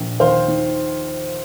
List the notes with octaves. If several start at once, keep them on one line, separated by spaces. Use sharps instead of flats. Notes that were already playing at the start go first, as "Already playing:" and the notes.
Already playing: A#1 A#2
D#2 C5 F5
D#3